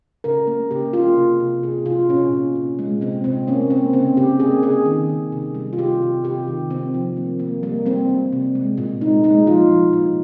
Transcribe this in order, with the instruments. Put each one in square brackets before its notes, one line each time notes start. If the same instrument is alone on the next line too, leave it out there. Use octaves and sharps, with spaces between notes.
[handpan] C#3 A#4
A#3
C#3 G4
A#3 F4
C3
C3
C3 G#4
C3 F4
A#2 C#4
A#2
A#2
G#3
C3 C4
C3 C4
A#3 C#4
A#3 C4
C#3 C4
C#3 G4
A#3 G#4
C#3 G#4
D#3
D#3
C3
G3
F4
C3 G4
C3
C3 G4
D#3
C3 C4
F3
A#3
A#3
G3 A#3
G3 C4
G3
C3
G#3
A#2
G#3 D#4
G#3 D#4
F3 F4
F3
A#2